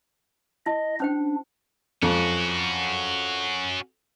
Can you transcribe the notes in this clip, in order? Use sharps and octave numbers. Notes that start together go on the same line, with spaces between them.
E4 D#5
C#4 D4 C5 G5
F2 C#4 F#4